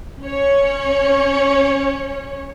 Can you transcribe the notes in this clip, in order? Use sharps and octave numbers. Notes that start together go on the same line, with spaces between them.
C#4 C#5